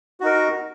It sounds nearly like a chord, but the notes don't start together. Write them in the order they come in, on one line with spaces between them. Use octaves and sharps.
F#4 D#4 A#4